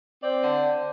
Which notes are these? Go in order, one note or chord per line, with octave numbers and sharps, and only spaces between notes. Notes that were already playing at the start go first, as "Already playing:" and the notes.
C4 D5
D3